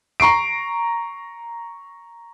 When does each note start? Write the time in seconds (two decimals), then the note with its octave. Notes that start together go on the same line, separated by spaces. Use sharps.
0.20 A#5 C#6 C7 D7